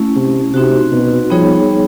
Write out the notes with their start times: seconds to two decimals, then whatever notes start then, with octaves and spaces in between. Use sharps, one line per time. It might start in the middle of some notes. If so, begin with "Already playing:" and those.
Already playing: A3 C#4 E4
0.16 C3
0.54 C3 C4 D#4 F#4
0.92 B2
1.30 F3 G3 B3 D#4 G#4 C#5